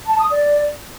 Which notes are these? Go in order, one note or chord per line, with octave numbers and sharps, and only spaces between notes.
A5
D#6
D5